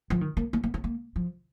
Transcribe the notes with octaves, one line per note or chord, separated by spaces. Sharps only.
F3
D#3
A#3
A#3
A#3
C4
A#3
F3